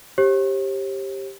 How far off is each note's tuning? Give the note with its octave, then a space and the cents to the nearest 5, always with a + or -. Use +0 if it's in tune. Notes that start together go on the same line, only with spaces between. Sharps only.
G4 +0 C5 +45